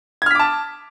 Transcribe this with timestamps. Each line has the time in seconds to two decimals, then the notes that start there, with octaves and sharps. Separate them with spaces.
0.22 G#6
0.26 F6
0.31 B6
0.35 D6
0.39 A5